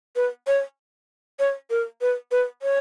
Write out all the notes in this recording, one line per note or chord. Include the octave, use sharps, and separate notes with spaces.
B4
C#5
C#5
A#4
B4
B4
C#5